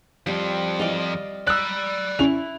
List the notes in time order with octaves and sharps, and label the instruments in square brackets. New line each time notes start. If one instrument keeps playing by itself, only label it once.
[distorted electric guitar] F2 F3 [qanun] G3
[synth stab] G#2 E3 [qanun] D5 D#5 F5
[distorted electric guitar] D5 B5 [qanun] A#5 [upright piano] E6 F#6
[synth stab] C#3 C#4 [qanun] E4 [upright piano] F7